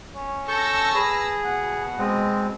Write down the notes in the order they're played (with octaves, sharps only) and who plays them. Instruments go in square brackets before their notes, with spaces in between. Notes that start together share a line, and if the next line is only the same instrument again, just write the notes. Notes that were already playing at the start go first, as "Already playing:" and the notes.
[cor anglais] C#4
[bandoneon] A4 C#6 G6 [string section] A5 E6 A#6
[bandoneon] G#4 [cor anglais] B4
[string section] B2 [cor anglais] F#5
[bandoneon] G#3 C4 [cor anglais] D#5